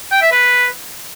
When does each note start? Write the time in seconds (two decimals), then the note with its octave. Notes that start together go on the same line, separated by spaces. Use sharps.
0.12 G5
0.21 E5
0.31 B4